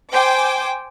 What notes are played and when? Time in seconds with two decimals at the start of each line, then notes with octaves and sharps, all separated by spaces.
0.12 C5 G5 G#5 D6